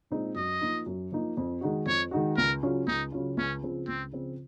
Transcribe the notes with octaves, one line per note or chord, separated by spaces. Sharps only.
A#2 G#3 C4 D#4
F#2 D#5
F3 A#3 D#4
F#2
F3 A#3 D#4
F2
D#3 G#3 D#4 F#4
F2 C#5
D#3 G#3 D#4 F#4
C#2 A#4
C#3 F#3 C#4 F4
C#2 D#4
C#3 F#3 C#4 F4
C#2 C#4
C#3 F3 C4
C#2 C4
C#3 F3 C4